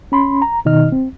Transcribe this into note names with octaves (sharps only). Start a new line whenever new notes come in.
C#4 B5 C6
A#5
B2 D#3 D#4 D#5 F6
C4